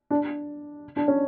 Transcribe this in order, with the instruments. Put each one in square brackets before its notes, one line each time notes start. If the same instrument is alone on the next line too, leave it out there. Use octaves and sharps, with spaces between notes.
[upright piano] D4
D4
C#4